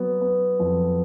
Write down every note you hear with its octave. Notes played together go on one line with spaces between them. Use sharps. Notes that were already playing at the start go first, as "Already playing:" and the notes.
Already playing: F#3 B3
B3
F2